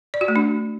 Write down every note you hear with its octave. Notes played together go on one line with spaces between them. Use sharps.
D5
F#4
A3
D4